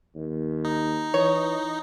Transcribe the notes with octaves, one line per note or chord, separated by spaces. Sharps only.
D#2
D#4
E3 C#5